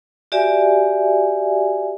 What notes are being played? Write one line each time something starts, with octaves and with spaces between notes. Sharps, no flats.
F#4 G4 D5 E5 G#5